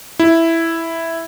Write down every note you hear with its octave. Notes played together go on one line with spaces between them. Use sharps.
E4